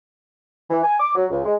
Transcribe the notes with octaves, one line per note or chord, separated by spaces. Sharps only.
E3
G#5
D6
F#3
C#2
G#3